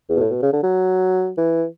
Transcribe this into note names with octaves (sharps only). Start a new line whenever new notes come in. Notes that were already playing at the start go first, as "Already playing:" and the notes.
E2
B2
A2
B2
C#3
D3
F#3
E3